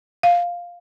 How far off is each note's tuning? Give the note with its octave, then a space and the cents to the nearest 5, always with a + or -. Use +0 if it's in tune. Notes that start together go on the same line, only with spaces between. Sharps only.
F5 +5